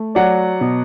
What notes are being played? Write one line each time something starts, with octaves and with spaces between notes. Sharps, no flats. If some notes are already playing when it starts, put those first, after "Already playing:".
Already playing: A3
F#3 D5 F#5
B2